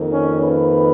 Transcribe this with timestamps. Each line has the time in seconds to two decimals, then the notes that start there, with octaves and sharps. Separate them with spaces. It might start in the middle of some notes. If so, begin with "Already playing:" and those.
Already playing: F2 D#3 A#3
0.09 C#4
0.40 B4